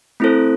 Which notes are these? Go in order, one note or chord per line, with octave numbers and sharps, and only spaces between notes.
A3 C4 E4 A4 C5